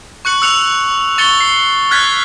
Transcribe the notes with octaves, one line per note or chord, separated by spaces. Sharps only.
C#6 F#6 C#7 F#7
E6 F#6 C#7 F7
C#6 A6 C#7 G7
C7
F6 F#6 G#6 A6 B6